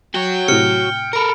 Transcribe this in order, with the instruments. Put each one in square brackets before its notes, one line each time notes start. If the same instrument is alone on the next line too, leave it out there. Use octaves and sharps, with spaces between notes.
[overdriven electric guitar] F#4 C#5 [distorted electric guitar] G5
[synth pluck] A2 C3 [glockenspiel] F6 C#7
[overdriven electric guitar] A4 A#4 [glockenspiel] B5 D7